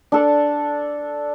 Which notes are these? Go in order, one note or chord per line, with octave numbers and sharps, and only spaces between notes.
D4 A4 D5